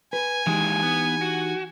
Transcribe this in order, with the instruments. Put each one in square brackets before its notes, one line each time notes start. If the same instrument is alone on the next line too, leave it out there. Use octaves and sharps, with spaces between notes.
[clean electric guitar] B4 [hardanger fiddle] G#5
[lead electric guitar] D#2 G#3 [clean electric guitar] E3 D#4 G4
[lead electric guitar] B3
F#4